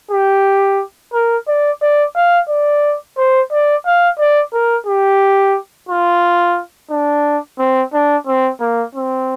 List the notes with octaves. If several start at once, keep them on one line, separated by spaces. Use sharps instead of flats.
G4
A#4
D5
D5
F5
D5
C5
D5
F5
D5
A#4
G4
F4
D4
C4
D4
C4
A#3
C4